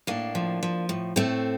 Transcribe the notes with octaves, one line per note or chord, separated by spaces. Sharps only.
A2 A#3 D4
F3
F3
A2
A2 A3 C4